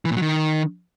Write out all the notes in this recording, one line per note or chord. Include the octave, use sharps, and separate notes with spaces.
E3
A#2
F#3
D#3